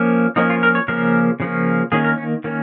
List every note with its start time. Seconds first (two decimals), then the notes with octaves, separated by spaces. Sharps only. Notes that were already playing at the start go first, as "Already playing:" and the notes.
Already playing: F3 A#3 C#4
0.36 F3 A#3 C#4 D#4
0.50 F4
0.63 A#4
0.75 C#5
0.88 C#3 F3 A#3 C#4 A#4
1.40 C#3 F3 A#3 C#4
1.92 D#3 A#3 C#4 G#4
2.05 A#4
2.18 C#4
2.44 D#3 A#3 C#4